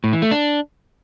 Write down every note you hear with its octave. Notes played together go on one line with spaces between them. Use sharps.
A2
E3
A3
D4